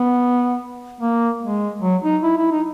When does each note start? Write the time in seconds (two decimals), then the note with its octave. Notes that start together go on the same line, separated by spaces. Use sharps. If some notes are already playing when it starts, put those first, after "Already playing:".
Already playing: B3
1.01 A#3
1.42 G#3
1.82 F#3
2.03 D#4
2.23 E4
2.38 E4
2.51 D#4